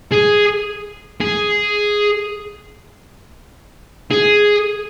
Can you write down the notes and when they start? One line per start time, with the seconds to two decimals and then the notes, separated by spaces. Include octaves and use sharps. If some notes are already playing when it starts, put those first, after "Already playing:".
0.12 G#4
1.21 G#4
4.11 G#4